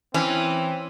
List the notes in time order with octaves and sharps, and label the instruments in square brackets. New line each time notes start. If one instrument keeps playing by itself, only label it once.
[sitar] E3 [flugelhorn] C4 [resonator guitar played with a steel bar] C#4